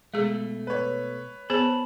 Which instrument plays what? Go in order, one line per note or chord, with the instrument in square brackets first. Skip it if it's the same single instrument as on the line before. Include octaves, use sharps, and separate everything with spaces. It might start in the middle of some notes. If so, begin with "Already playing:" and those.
[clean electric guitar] B2 A3 [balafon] G#3 G#4
[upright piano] B4 C#5
[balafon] B3 G#4 C5 [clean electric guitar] A5 B5